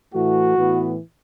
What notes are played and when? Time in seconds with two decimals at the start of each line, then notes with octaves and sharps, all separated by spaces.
0.14 A2 E3 A3 F#4
0.56 A2 E3 B3